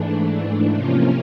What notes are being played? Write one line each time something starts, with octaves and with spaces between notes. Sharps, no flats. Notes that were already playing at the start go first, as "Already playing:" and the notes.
Already playing: G#2 E3 A3 D4
C3 F3 A#3 C#4 F4